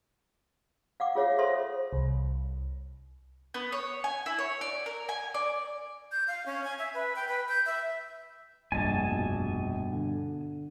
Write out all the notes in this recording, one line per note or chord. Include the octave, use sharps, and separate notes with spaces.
F5 F#5 D6
F4 G#4 C#5 E5 F5
A4 C5 C#5 E5 C6
C2
B3
C#5
G#5
E4
C#5
D5
A#4
G#5
D5
G6
F5
C#4
G#5
E5
B4
G5
B4
G6
E5
F1 A#1 G2 A#2 G#5 A5
G2 B2
D3